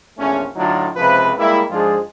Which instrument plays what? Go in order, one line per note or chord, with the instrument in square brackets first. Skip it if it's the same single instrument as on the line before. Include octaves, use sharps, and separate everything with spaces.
[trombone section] A#1 E2 A3 C#4
A2 D3 F#3 D4 D#4 F4
C#2 C3 F3 B4
G3 G#3 A#3 E4
G#2 F3 G#3 D4 F4 G#4